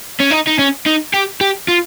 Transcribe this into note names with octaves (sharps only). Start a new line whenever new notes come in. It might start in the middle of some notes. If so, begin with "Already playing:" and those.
C#4
D#4
D#4
C#4
D#4
G4
G4
F4